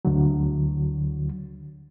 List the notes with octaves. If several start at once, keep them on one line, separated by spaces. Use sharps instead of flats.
D2 D3 F#3